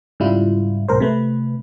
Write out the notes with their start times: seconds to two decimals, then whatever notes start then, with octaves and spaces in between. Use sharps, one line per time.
0.20 G#2 C#3 G3 E4 F4
0.89 B1 G#2 A#4 C5
1.00 C3 A3 B4